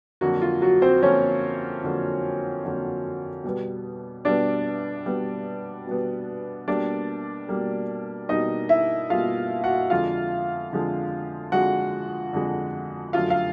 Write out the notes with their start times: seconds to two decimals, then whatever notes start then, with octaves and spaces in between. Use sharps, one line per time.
0.21 F2 D3 F#3 A#3 F#4
0.42 F4
0.62 F#3 F#4
0.82 C4 C5
1.02 F2 D3 F#3 A#3 C#4 C#5
1.82 F2 D3 F#3 A#3
2.64 F2 D3 F#3 A#3
3.44 B2 G3 B3
4.25 B2 G3 B3 D4 D5
5.06 B2 G3 B3
5.87 B2 G3 B3
6.68 B2 G3 A#3 D4 D5
7.49 B2 G3 A#3
8.29 B2 G3 A#3 D#4 D#5
8.69 E4 E5
9.10 B2 G3 A#3 F4 F5
9.64 F#4 F#5
9.90 F2 D3 F3 G#3 F4 F5
10.71 F2 D3 F3 G#3
11.52 F2 D3 F3 G#3 F#4 F#5
12.33 F2 D3 F3 G#3
13.13 F#2 D3 F3 A3 F4 F5
13.30 F5